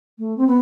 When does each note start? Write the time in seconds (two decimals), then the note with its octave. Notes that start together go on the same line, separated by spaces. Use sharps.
0.18 A3
0.37 C4
0.47 B3